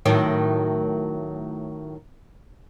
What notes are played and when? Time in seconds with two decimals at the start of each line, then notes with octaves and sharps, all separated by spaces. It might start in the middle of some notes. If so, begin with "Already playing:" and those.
0.06 A2 D#3 F#3